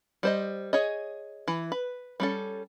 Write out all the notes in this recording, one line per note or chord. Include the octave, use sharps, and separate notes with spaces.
G3 C5 D#5
G#4 C#5 D#5
E3
B4
G3 C#4 A4